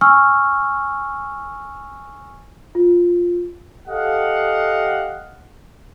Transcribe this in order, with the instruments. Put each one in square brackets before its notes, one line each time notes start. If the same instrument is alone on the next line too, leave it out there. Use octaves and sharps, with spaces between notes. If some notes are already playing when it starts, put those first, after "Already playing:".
[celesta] G#5 C#6 E6 F6
F4
[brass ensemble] G4 A4 D#5 F5 F#5